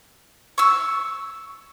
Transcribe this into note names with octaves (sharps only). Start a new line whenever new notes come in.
C#6 E6